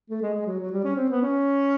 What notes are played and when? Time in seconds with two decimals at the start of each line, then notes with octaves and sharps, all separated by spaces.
0.10 A3
0.22 G#3
0.34 G#3
0.47 F#3
0.60 F#3
0.72 G3
0.84 C#4
0.96 C4
1.09 B3
1.22 C#4